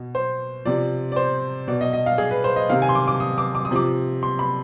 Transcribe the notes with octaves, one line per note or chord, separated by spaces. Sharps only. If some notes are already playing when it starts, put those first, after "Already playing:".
Already playing: B2
C5
C3 F3 D5
D5
C5
B2 D5
D#5
D#5
F5
G#4
B4
C5
D#5
C3 D#3 F5
G#5
C6
D6
D6
D#6
D6
D6
D#6
C3 F3 D6
C6
B5